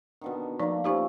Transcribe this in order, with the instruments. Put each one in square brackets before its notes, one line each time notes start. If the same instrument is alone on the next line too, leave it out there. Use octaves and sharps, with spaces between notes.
[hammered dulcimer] B2 D3 D#3
[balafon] F3 D#4 D5 [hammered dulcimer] A3 A#3 D4
[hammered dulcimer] F3 C#4 E4 [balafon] D#4 G4 C#6